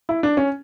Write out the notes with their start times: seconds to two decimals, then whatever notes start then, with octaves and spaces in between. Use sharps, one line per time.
0.09 E4
0.23 D4
0.37 C#4